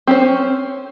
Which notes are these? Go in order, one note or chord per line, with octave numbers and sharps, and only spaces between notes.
C4 C#4 C5